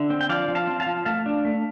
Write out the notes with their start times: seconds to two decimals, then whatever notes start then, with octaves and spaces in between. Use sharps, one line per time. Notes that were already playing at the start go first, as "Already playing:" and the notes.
Already playing: D3 E5
0.10 C4
0.21 G5
0.29 F3 D5 F5
0.48 F3
0.55 F5 A5
0.67 C4
0.80 F5 A5
0.86 F3
1.05 A3 F5 A5
1.26 D4
1.45 A3